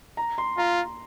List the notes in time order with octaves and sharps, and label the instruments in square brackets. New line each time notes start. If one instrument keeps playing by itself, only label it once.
[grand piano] A#5
C6
[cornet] F4 [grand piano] A#5